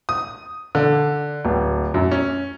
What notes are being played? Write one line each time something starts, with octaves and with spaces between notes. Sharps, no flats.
D#6
D3
D1
F#2
C#4